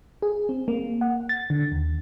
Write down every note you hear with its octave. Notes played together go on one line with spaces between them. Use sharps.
G#4
C4
A#3
F#5
A6
D3
D#2